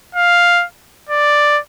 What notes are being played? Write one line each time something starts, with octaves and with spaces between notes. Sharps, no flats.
F5
D5